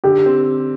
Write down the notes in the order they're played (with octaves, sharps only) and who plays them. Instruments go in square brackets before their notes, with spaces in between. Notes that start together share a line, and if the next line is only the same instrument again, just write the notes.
[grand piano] D3 [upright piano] G4
[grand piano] C4